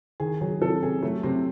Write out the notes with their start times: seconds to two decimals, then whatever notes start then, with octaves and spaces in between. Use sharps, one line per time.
0.20 D#3 G#4
0.41 F#3 G#4
0.61 C3 A4
0.83 C3 G#4
1.03 F#3 A3
1.23 C3 C4